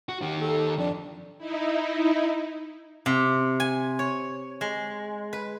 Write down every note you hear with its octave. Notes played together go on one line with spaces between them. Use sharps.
F#4
D#3 G4
A4
F2 D4
D#4 E4
C3
G#5
C#5
G#3
B4